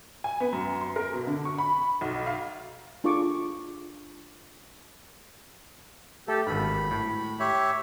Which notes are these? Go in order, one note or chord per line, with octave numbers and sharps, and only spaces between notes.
G#5
B3
F#2
C6
A#4
B2
D3
C#6
B5
B1
F5
D4 F4 G#4 A4 C#6 D6
A3 G4 A4
G#1 G2 B5
A2
G4 C#5 E5